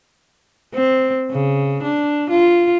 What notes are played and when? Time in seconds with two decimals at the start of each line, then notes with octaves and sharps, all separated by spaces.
0.74 C4
1.31 C#3
1.83 D4
2.30 F4